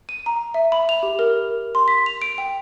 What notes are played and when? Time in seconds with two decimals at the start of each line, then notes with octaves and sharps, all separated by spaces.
0.09 D#7
0.26 A#5
0.54 E5
0.72 B5
0.89 F7
1.03 G4
1.19 A#4
1.75 C6
1.88 B6
2.06 F7
2.22 D7
2.38 G5